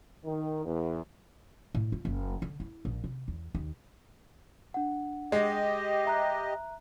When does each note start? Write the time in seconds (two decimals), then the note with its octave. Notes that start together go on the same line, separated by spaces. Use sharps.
0.24 D#3
0.65 E2
1.75 A2
1.92 F4
2.05 F#1
2.42 D3
2.60 E4
2.85 A#1
3.04 C3
3.28 E2
3.55 D#2
4.74 D4 F#5
5.32 G#3 G4 D#5
6.05 E5 A#5 F#6